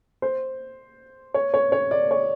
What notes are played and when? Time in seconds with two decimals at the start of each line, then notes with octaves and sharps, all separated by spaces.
0.22 C5
1.34 C#5
1.54 C#5
1.72 C#5
1.91 D5
2.11 C#5